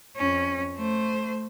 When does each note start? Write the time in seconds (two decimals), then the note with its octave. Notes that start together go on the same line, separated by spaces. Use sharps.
0.16 F2 C#4
0.76 A3 C5